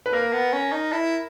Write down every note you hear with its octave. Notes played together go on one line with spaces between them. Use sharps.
B4
A#3 A#4
B3
C#4
D#4
E4